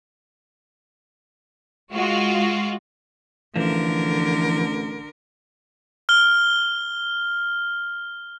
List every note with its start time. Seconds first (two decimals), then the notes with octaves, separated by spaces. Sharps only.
1.93 G#3 F4 F#4
3.56 A1 D3 E3 F3 A#4
6.09 F6 G7